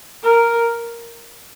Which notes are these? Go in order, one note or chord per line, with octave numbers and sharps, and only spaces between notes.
A#4